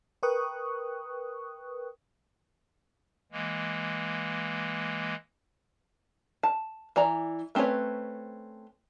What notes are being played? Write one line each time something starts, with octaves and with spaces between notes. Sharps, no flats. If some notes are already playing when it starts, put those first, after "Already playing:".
A#4 B4 G5 C#6 D#6 F#6
E3 G#3 A#3
A5
E3 D5 A#5
A3 C4 C#4 B4 C#5